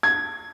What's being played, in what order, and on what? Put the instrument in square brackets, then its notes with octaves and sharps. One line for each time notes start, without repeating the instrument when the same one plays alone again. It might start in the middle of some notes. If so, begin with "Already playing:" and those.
[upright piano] G#6